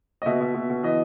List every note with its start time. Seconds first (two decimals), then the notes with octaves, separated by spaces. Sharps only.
0.22 D#5
0.26 B2 E5
0.40 B2
0.54 B2
0.70 B2
0.83 E3 D#5